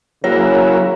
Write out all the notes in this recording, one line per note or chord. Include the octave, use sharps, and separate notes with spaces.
C#3 F#3 A#3 E4 C#5